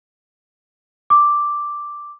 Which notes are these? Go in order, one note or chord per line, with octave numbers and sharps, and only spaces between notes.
D6